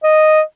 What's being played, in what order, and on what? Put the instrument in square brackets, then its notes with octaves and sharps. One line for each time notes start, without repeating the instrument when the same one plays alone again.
[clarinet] D#5